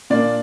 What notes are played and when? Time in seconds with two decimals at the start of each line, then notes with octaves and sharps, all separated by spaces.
0.10 A#2 A#3 D4 D5